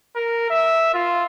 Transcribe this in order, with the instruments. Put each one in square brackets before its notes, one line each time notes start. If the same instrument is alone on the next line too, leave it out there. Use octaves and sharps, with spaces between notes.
[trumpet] A#4
E5
F4